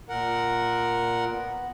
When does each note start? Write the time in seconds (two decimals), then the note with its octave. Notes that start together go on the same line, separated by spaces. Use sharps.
0.09 A#2 A#4 F#5
1.33 B3